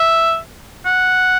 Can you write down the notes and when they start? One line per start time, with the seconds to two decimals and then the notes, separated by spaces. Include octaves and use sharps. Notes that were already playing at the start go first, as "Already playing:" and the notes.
Already playing: E5
0.86 F#5